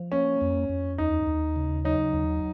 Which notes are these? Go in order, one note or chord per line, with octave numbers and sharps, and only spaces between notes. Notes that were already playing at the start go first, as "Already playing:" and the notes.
Already playing: F3
A#3 C#4
F2
F2
D#2 D#4
D#2
C#3
F#3 D#4
D#2